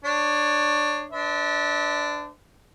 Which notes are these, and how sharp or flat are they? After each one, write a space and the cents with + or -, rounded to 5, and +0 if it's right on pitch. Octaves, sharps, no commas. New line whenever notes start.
D4 +15 C#5 +0
D4 +0 C5 -45 E5 -40